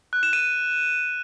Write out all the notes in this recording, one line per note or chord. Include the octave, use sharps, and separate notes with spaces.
F#6
E7
D#7